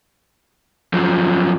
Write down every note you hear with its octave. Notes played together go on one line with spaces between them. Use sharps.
F#2 F3